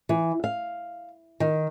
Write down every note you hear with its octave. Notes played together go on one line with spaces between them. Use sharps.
E3
F5
D#3